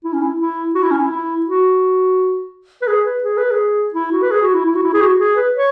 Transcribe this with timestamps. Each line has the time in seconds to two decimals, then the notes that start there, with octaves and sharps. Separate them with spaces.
0.04 E4
0.13 C#4
0.22 E4
0.40 E4
0.75 F#4
0.83 E4
0.91 C#4
1.00 E4
1.11 E4
1.46 F#4
2.82 B4
2.88 G#4
3.05 B4
3.24 G#4
3.37 B4
3.51 G#4
3.94 E4
4.12 F#4
4.22 B4
4.31 G#4
4.43 F#4
4.54 E4
4.66 E4
4.75 F#4
4.83 E4
4.94 G#4
5.01 F#4
5.20 G#4
5.36 B4
5.54 C#5